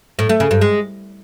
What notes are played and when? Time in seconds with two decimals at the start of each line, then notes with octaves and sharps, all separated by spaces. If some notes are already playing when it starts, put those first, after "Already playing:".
0.19 A2
0.29 A3
0.40 C#3
0.51 G2
0.61 G#3